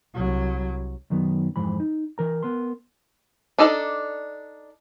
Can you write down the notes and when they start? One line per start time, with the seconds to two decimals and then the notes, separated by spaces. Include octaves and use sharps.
0.14 C2 F#3
1.10 F#2 D#3 F#3 B3
1.56 F2 G#2 E3 B5
1.80 D#4
2.18 E3 A#4 A#5
2.43 B3 A#4 C6
3.58 D4 D#4 A4 D5